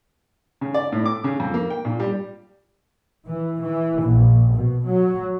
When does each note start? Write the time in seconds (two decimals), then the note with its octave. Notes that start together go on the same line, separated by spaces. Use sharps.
0.61 C#3
0.74 D5
0.92 A2
1.06 D6
1.24 C#3
1.40 F2
1.54 A#3
1.70 G5
1.85 A#2
2.00 G3
3.27 E3
3.62 E3
4.03 A#1
4.53 B2
4.86 F#3